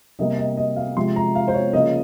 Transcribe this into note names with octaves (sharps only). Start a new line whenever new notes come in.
C3 G3 A#3 D#5
D#5
D#5
F5
C3 F3 G#3 C6
A#5
F5
C5
C#5
C#3 F3 A#3 D#5